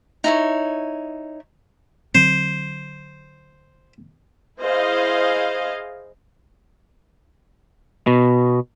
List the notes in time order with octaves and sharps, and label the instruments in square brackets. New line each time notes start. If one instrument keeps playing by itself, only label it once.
[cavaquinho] D#4 E4 C#5
[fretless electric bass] D3 F#3 C4 [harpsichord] C5
[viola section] E4 G#4 C5 D#5 F5
[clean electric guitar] B2